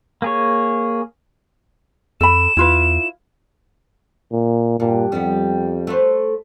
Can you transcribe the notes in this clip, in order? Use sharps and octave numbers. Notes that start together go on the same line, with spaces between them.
A#3 G#4 C#5
F2 A4 B5 E7
E2 E4 F4 B4
A#2
G2 A#2
F2 G3 B3
A3 B4 C5